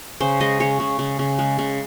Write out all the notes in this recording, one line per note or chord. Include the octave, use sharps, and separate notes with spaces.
C#3 C5
G#3 D#5
C#3 C#5
C#3
C#3
C#3
G#3
C#3